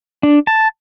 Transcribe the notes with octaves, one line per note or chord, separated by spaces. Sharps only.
D4
A5